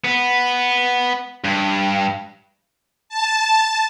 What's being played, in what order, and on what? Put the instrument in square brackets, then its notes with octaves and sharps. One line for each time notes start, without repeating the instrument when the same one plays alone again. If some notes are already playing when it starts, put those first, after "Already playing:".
[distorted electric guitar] B3
G2
[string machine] A5